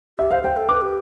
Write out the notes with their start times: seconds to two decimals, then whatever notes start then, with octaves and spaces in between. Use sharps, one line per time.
0.18 G4 E5
0.31 C5 F5
0.43 C5 G5
0.57 A4
0.69 B4 D6
0.81 G4